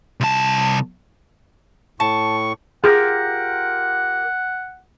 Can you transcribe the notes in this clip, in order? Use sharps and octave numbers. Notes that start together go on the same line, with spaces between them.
C2 A5
A2 A5 C#6
F4 G4 G#4 A#4 F#5